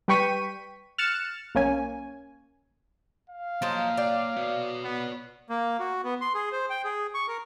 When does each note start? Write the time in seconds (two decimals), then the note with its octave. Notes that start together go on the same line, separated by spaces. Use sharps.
0.08 G3 B4 G5 C#6 B6 D#7
0.98 F6 F#6 A6 C#7 E7
1.55 B1 A#3 C#4 G#5
3.30 F5
3.62 F3 F#3 A#3 D#4 C6
3.97 F#3 D5 G5
4.36 F#4 B4
4.84 B3
5.50 A#3
5.79 F#4
6.04 B3
6.21 C6
6.34 G#4
6.52 C5
6.70 G5
6.84 G#4
7.14 C#6
7.28 A#4